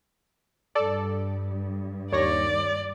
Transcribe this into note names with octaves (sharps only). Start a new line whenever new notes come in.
G2 A4 D5
D#2 C#5 D5 A#6